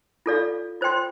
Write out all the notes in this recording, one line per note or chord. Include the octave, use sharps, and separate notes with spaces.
F4 A4 D5 F5
F4 C5 G5 C6